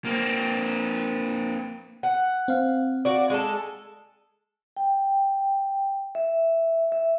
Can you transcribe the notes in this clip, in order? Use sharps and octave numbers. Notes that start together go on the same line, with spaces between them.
A#3 C4
F#5
C4 F5
F#4 D5
G#3 A4
G5
E5
E5